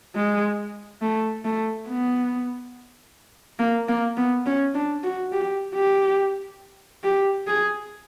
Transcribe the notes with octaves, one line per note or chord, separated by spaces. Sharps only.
G#3
A3
A3
B3
A#3
A#3
B3
C#4
D4
F#4
G4
G4
G4
G#4